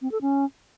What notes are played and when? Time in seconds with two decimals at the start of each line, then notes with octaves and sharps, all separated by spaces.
0.02 C4
0.12 A4
0.22 C#4